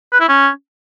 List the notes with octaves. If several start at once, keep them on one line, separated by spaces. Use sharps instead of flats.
B4
E4
C#4